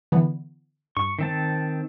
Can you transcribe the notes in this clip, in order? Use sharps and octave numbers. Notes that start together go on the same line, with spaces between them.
D3 E3 B3
G2 C#6
D#3 C4 A5